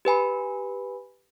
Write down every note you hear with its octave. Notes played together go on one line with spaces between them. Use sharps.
G4 B4 G#5 B5